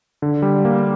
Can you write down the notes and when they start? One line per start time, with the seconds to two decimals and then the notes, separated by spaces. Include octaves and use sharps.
0.22 D3
0.42 G3
0.65 A#3